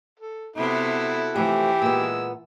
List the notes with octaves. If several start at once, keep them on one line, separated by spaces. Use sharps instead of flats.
A4
C3 B3 E4 F#4 A4
C3 E3 F3 A3 G4
A#2 G#3 B3 E6